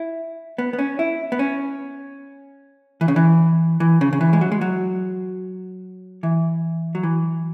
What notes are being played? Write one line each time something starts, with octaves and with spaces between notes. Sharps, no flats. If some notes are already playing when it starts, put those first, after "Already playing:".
Already playing: E4
B3
B3
C#4
E4
B3
C#4
E3
C#3
E3
E3
C#3
C#3
E3
G#3
F#3
G#3
F#3
E3
F#3
E3